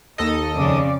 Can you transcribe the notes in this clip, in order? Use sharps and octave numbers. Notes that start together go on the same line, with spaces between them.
D#2 D#4 A4 D#5
F2 C#3 D5